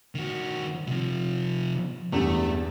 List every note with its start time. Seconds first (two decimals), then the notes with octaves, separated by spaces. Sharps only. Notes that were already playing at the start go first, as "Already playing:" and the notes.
0.15 D#3 F#4
0.87 C3 F3
2.12 E2 G2 G3 A3